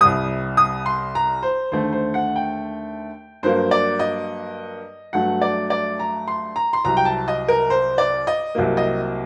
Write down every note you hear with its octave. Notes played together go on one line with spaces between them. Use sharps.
C2 C3 G3 D#6
D#6
C6
A#5
C5
D#2 D3 A3 C5
C5
F#5
G5
G2 F#3 A#3 C5
D5
D#5
G2 F#3 A3 F#5
D5
D5
A#5
C6
A#5
C6
C2 C3 F#3 A#5
G5
A5
D#5
A#4
C5
D5
D#5
C2 C3 F#3 A#3
D#5